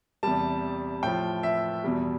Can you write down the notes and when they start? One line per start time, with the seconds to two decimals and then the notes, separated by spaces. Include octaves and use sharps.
0.23 E2 C3 G3 A5
1.03 A2 F3 G5
1.43 E5
1.84 E2 B2 G3